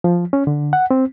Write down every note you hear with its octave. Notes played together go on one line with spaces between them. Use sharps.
F3
C#4
D3
F#5
C4